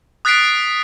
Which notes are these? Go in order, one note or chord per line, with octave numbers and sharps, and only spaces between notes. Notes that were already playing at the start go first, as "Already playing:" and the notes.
D#6 F#6 A6 B6 C7 D7